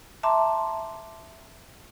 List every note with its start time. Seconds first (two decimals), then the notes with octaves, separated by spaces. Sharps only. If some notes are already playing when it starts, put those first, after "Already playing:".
0.23 E5 A5 A#5 C6 D6